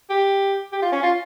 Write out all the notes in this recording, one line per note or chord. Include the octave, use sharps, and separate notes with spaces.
G4
G4
F4
C#4
F4